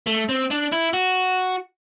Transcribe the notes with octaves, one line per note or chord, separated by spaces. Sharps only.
A3
C4
D4
E4
F#4